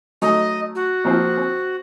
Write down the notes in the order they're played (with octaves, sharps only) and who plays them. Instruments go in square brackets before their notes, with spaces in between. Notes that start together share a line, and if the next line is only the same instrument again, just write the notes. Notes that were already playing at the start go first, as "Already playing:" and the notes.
[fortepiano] F#3 A3 D#4 [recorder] D#5
[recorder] F#4
[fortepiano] A#1 F3 C4
C4